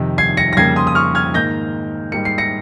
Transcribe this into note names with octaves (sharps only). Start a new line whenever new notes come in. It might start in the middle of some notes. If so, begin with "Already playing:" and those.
Already playing: F2 C3 D#3
G#6 C7
A#6 C#7
A#6
F2 C#3 G3 A#3 G#6 C7
C6 D#6
D#6
C#6 F6
F6 G#6
G#2 D#3 A#3 G6 A#6
G#2 G3 A#3 C#7
C7
A#6 C#7